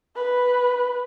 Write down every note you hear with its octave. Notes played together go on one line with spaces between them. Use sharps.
B4